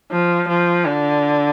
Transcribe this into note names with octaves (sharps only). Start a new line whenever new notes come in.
F3
F3
D3